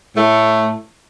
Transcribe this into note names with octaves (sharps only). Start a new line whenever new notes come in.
A2 A3